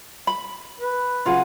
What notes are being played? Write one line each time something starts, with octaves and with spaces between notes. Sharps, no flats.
B5
B4
C#3 F#3 F4 G#4